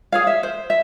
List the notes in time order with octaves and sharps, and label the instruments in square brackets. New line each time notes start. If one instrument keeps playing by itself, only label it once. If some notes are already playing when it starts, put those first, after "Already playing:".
[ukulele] G#4 C#5 F5
E5
C5
E5